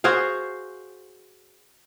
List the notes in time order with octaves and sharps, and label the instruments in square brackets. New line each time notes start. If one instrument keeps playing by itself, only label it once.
[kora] F#4 G#4 C5 F5